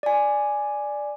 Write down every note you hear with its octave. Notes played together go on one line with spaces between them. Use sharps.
D5 G#5